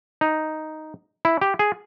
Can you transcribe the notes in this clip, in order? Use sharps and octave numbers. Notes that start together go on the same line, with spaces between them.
D#4
E4
G4
G#4